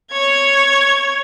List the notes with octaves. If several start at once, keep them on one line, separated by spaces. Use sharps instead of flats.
C#5 G#6